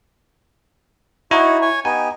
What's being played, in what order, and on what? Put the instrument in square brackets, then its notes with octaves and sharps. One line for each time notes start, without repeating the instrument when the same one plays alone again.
[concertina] D#4 F#4 C#5 [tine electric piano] E4
[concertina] C#5 G#5
[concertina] B3 D#4 G4 [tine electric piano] G#5